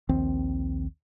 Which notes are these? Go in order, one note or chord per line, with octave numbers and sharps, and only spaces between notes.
A#1 D#2 D#3 C4